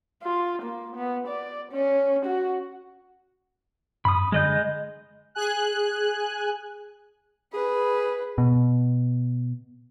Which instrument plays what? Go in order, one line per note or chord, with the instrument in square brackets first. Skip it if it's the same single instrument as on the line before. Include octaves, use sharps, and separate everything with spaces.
[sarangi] F4
A#3
B3
D5
C#4
F#4
[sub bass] F#2 [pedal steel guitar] B5 D#6
[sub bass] D3 [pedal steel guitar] G#3 D#5 G6
[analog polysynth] G#4 G#5 F#6
[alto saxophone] G#4 [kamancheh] B4
[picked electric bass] B2